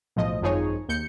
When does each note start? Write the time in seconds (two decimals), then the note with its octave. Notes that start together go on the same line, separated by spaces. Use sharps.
0.16 B1 A2 F3 D#5
0.42 G#1 F#2 F3 D#4 G#4 C#5
0.89 D#2 G6 C#7